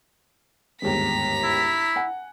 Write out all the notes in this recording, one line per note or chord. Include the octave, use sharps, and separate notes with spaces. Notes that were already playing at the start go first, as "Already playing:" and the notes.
G1 D#2 G#2 A#5 B6
E4
F#5 G#5